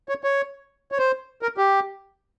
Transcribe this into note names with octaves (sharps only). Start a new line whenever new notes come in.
C#5
C#5
C#5
C5
A#4
G4